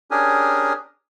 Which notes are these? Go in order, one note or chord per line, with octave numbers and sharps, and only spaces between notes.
C#4 D4 G4 G#4 A#4 G#5